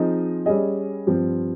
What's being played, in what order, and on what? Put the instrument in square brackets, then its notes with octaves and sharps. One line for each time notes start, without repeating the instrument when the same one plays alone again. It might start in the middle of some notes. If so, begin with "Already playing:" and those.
Already playing: [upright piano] F3 C4 D#4 G#4 D#5
G3 C#4 G#4 D#5
G2 F3 C4